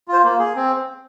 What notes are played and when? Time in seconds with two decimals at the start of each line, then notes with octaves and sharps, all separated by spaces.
0.08 F4 C5
0.23 A#3
0.39 G#4
0.56 C4